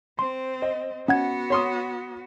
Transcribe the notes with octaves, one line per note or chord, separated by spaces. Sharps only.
C4 C6
D#5
B3 C#4 F#4 F#5 G#6
C#5 C6 D#6